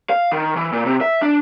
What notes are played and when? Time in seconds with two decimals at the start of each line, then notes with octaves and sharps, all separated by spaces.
0.10 F5
0.32 D#3
0.56 E3
0.72 A#2
0.86 C3
1.01 E5
1.22 D4